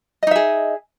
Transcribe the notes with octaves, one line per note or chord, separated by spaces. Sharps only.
D#4 G#4 D#5 E5